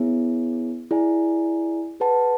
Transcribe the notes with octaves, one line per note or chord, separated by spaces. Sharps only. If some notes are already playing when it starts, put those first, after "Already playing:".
Already playing: B3 E4 G#4 C#5 E5
E4 G#4 D5 G#5
G#4 B4 F#5 A5